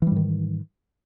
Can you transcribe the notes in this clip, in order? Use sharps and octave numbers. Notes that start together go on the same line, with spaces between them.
G#2 D#3 E3 G3